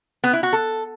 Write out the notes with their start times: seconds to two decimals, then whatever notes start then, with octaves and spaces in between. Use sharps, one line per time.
0.24 B3
0.33 E4
0.43 F#4
0.53 A4